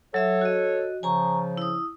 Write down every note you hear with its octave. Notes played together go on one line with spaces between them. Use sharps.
F#3 A4 C#5 E5 E6
F#4 D#5
C#3 F3 G#5 A#5 C#6
E4 D#6